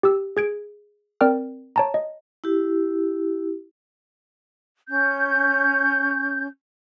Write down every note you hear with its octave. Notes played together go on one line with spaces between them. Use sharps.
G4 E6
G#4 G#6 D7
C4 A#4 D5 G5 F6
C#5 A5 A#5
D#5
E4 G4
C#4 G6